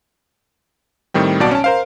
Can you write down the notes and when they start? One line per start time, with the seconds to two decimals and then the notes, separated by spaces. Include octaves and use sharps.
1.14 A2 D#3 G3 C4
1.40 B1 B2 F#4 D5 A5 D7
1.51 C#4 A5
1.64 A#4 C5 F5